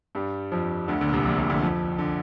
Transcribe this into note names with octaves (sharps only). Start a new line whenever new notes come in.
G2 G3
F2 F3
D2 D3
D2 D3
A#2
C2 C3
A#1 A#2
C2 C3
D2 D3
F2 F3
D3